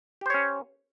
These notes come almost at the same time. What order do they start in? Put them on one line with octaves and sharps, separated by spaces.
G4 C5 C#5 C#4